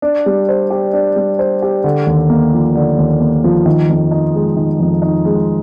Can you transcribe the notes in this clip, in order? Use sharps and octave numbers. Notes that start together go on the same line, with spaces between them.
D4
G3
C5
G4
D4
G3
C5
G4
D3
D#2
A#3
F3
D3
D#2
A#3
F3
D#3
F2
D#4
G#3
D#3
F2
D#4
G#3